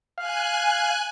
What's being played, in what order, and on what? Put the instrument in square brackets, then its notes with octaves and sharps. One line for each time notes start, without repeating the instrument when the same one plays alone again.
[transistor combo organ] F5 [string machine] G#5 F#6